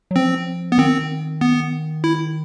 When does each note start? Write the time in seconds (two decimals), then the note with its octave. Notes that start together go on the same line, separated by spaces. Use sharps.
0.11 F#3
0.16 F3 C4
0.72 B3
0.78 D#3 C4
1.41 B3
2.04 E4